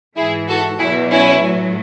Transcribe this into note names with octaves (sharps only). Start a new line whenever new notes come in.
G#2 E3 E4 G#4
F#4 A4
E2 B2 F#3 E4 G#4
C#4 E4
A2 F#3